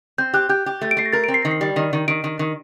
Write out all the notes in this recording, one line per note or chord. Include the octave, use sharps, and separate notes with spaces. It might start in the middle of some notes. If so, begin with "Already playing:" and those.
C4 G6
G4 F#6
G4 G6
G4
A3
D7
A3 C7
A#6
A#4 A6
D7
C4
C7
D#3 A#6
C7
G3
D#3
D#3
D#3 D7
D#3
D#3